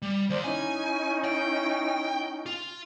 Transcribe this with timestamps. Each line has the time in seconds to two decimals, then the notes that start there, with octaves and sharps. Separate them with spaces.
0.02 G3
0.30 D#2 C5 D5
0.44 C#4 D#4 E4 G#5
1.25 G5
2.46 F4